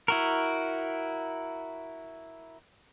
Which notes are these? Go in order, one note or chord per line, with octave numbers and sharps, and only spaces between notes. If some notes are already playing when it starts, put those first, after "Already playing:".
E4 F#4 A#4